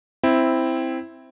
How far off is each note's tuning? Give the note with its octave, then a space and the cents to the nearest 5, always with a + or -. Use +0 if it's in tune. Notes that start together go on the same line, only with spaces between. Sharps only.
C4 +0 E4 +0